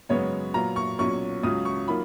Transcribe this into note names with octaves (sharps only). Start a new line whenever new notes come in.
F#2 C#3 G#3 B3 C#5
A#2 F#3 B3 F4 A#5
C#6
B1 A#2 F#3 C#4 C#6
C#2 C#3 F#3 C#4 F4 D#6
C#6
D#3 F#3 A#3 F4 B5